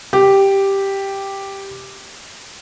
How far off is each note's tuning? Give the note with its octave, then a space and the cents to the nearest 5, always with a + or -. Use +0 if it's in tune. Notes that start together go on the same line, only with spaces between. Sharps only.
G4 +0